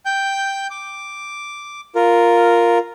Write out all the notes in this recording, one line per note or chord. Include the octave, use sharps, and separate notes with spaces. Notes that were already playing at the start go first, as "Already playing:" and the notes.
G5 G6
D6
F4 A#4